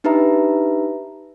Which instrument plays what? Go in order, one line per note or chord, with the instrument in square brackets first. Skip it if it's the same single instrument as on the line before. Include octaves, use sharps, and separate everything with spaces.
[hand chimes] D4 D#4 G4 B4 E5 A#5